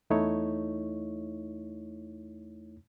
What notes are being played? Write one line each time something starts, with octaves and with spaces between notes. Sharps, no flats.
E2 A3 D#4 E4 C#5